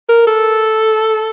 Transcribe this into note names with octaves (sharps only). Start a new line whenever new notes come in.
A#4
A4